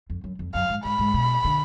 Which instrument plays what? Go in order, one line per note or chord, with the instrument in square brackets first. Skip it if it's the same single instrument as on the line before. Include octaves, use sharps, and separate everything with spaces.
[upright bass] F2
F#2
F2
[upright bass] F#2 [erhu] F5
[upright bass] G#2
[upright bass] G#2 [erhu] B5
[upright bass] G#2
B2
D3